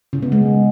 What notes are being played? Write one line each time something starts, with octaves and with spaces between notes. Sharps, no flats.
C#3
B3
G#3